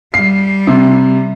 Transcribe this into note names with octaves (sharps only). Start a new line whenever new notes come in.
G3 C7
C3